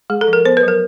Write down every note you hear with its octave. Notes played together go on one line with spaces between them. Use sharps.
G#3 G#4
A4
F3
A#4
B3 C5
B4
F#3
A#4